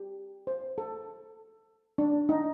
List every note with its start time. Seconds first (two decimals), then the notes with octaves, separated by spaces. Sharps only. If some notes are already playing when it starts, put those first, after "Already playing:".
Already playing: G4
0.47 C5
0.78 A4
1.98 D4
2.29 D#4